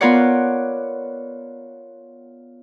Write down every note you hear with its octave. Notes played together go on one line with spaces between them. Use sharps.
B3 F4 A#4 C#5 D5 F#5